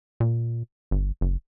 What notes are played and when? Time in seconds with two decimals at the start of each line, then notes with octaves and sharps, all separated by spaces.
0.20 A#2
0.91 G1
1.21 F#1